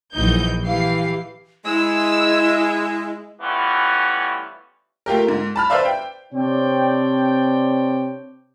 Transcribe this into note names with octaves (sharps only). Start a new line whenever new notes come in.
A#1 E3 F#3 D#4 G6
E3 G4 F5 C7
G#3 E4 E6
E3 G3 A3 B3 C#4 F4
A3 F4 G4 A#4
G#2
A5 B5 F6
B4 C5 D5 E5 F5
G5
C3 C4 D4 C#5 D5 G5